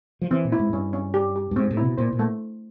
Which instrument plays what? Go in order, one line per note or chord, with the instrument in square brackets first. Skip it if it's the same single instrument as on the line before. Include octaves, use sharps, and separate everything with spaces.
[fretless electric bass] F3
[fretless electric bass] E3 [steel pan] C4
[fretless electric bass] A#2
[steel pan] E4
[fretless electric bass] G#2
[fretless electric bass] G2 [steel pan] C#4
[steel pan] C#4
G4
G4
[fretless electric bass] G2
[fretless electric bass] G#2 [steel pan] C4
[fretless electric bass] A2
[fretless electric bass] C3 [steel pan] E4
[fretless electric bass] B2
[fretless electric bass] A#2 [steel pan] C5
[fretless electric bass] A#2
[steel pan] A3